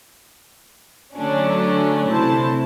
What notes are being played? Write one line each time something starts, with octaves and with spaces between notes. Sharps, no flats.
D3 F#3 A3 C#4 D4
C3 A3 E4 C5 A5